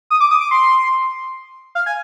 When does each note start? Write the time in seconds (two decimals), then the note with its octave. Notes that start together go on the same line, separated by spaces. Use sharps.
0.10 D#6
0.21 D6
0.31 D#6
0.41 D6
0.51 C6
1.75 F5
1.86 G#5